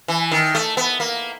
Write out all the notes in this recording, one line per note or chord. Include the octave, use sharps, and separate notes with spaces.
E3
D#3
A3
B3
A#3